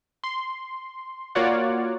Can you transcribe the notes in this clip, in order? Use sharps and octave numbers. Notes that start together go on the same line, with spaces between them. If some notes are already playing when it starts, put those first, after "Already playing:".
C6
A#3 F4 F#4 C#5 D5 F#5